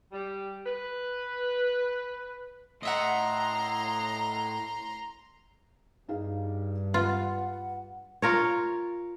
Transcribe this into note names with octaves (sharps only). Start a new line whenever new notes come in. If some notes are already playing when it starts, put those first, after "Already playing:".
G3
B4
A2 D#5 E5 F#5 A#5 C6
G2 D#4 G#4 F5
F4 B4 F#5
F4 A#4 C#5